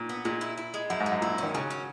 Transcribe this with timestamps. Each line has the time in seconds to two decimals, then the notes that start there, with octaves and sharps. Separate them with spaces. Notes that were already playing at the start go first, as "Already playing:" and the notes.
Already playing: A#2
0.09 B3
0.25 A#2 G#3
0.41 E4
0.57 E4
0.74 G#3
0.90 F#2 E4
1.00 G#2
1.06 G#3
1.12 F#2
1.22 A#2 E4
1.38 D#3 C#4
1.55 C#3 F#3
1.70 C#4